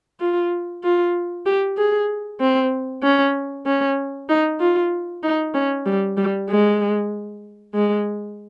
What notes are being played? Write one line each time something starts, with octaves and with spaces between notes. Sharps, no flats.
F4
F4
G4
G#4
C4
C#4
C#4
D#4
F4
D#4
C#4
G3
G3
G#3
G#3